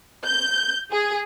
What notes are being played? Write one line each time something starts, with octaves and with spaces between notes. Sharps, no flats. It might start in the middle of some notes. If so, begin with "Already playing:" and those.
G6
G#4